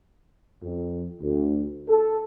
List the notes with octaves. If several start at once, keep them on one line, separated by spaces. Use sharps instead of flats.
F2
D2
A4